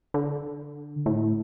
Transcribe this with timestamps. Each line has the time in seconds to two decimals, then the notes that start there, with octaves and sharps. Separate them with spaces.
0.14 D3
1.06 A2